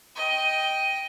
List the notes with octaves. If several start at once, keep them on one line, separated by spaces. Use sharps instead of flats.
D#5 G5